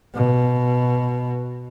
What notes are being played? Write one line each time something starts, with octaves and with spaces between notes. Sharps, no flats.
B2